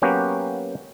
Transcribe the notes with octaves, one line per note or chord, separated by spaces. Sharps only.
F#3 A#3 B3 C#4 F#4 G4